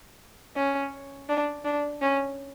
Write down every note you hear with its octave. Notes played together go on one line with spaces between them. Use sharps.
C#4
D4
D4
C#4